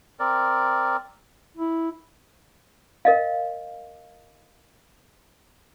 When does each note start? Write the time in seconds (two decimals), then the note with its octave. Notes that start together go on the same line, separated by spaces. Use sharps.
0.20 C4 A#4 D5
1.57 E4
3.05 A#4 D#5 F5